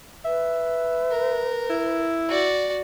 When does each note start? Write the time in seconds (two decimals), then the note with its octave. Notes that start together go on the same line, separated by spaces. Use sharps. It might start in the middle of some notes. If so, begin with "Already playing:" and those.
0.25 B4 E5
1.11 A#4
1.70 E4
2.29 F#4 D5